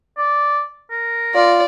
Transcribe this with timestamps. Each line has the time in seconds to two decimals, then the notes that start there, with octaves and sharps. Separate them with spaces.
0.18 D5
0.91 A#4
1.35 F4 D5